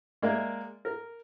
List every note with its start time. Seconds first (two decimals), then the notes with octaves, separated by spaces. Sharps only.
0.22 G#3 A#3 D5 E5
0.85 A#4